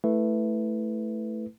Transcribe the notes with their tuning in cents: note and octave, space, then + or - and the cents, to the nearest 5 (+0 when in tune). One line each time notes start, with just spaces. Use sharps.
A3 +0 E4 +0 B4 +0